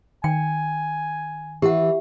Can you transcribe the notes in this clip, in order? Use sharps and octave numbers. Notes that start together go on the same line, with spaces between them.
D#3 G5 G#5
E3 G4 F#5